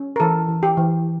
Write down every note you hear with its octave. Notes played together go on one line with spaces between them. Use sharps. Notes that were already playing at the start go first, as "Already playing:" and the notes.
Already playing: C#4
A#4
E3 A4
E3
G4
E3